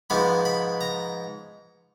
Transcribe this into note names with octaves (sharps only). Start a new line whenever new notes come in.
G#2 F3 G#3 B3 B5
B5
A#5